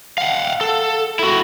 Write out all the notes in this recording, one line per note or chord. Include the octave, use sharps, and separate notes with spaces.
F5 F#5
A4
E4 F#4